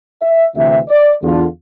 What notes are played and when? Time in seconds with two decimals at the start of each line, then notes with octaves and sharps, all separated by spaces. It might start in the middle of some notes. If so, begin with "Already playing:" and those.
0.22 E5
0.55 D2 C3 E3 E5
0.88 D5
1.22 E2 D3 F4